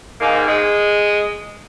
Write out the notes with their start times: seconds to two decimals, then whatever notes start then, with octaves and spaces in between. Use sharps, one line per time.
0.21 G#2 D#3 A#3
0.48 G#3